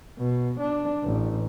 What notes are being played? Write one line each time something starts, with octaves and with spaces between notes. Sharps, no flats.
B2
D4
A1